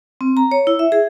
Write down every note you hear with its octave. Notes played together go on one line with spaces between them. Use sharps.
C4
A#5
C#5
E4
E5
G#4